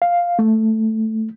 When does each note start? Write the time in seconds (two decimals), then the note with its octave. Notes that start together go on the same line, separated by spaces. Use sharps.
0.02 F5
0.39 A3